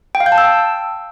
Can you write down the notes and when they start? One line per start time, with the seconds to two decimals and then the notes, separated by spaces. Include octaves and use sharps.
0.15 G5
0.20 F5
0.26 G6
0.32 A5
0.38 E6